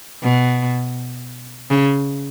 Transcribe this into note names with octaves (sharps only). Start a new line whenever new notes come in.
B2
C#3